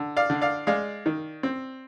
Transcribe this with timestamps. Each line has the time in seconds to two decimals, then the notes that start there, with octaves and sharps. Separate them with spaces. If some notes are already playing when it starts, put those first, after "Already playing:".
Already playing: D3
0.17 D5 F5
0.30 D3
0.41 D5 F5
0.67 G#3 D5 F5
1.06 D#3
1.43 C4